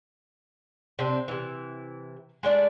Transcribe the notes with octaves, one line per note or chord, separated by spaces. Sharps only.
C3 C4 D4
C3 E3
G#3 A3 D4 D5